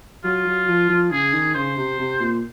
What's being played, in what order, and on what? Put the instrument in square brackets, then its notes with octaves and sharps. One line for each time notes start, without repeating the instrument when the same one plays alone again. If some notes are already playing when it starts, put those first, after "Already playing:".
[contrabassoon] F#3 [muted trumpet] F4
[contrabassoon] F#3
F3
F3
[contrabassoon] C#3 [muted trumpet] G#4
[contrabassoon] D#3
[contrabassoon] C#3 [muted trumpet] C5
[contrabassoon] C3
C3
A#2